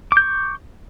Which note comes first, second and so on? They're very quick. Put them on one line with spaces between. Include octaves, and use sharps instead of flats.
D6 G6 C#6